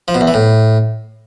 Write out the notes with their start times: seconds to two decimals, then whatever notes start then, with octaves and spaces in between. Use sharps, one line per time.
0.08 F3
0.15 B2
0.21 E2
0.28 E3
0.34 A2